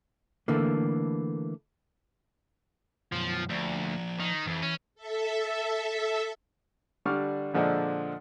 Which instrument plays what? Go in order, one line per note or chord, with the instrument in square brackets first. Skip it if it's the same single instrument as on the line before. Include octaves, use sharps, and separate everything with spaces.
[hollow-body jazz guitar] D3 E3 A3 A#3
[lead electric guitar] F#2 B2 [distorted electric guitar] F3
[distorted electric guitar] D2 [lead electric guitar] F3 D5
[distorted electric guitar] D#3
[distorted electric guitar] F2 [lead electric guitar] E3 E5
[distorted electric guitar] C#4
[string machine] A4 E5
[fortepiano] D3 G3 D4 C#6 D6 F6
A#2 D3 F3 G#3 D4 A4